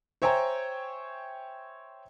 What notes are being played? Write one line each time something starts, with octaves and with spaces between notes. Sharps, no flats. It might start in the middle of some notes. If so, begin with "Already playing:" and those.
C5 C#5 E5 G5 G#5 A#5